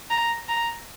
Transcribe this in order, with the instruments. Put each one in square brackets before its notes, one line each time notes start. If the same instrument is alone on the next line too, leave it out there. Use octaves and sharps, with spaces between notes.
[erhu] A#5
A#5